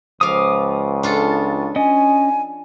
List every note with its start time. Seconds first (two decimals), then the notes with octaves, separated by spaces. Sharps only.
0.21 C#2 F3 F5 D6 D#6
1.03 D4 F4 A4
1.76 C#4 D#5 G#5